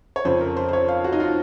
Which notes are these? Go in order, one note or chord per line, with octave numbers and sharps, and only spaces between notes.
C#5
F2 C#3 F3 C5
A#4
C5
C5
C#5
F5
F#4
D#4
F4